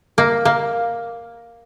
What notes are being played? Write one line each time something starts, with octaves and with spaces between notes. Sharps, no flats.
A#3
A#3